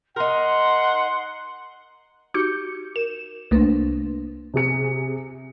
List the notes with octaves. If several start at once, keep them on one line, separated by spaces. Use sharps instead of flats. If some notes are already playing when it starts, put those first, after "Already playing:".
D#4 A#4 F#5 C6
D#4 F#4 G4 D6 G6 C#7
A#4 E7
C2 A3 A#3 D4 B4
C3 G#4 C#7